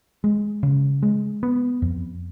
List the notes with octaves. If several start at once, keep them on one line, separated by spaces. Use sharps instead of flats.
G#3
C#3
G#3
B3
F2